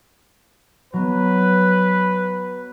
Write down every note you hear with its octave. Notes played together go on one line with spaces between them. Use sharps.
F#3 B3 B4